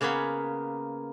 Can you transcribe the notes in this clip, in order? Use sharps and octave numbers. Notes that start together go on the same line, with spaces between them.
C#3 A#3 B3 C#5 B5 C6